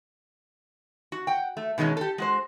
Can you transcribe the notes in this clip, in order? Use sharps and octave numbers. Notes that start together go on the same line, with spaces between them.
F#4
F#5 G5
A3
B2 D#3 G#3 A#3 C#4
G4 A4
G#3 F#4 C5